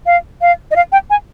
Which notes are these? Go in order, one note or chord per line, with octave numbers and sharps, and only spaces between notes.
F5
F5
D#5
F5
G5
G#5